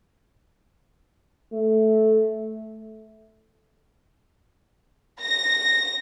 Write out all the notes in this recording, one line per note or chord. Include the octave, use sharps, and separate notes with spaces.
A3
A#6